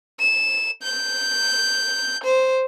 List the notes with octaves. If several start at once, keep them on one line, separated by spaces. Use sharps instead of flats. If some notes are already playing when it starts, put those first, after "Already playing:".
E7
G6
C5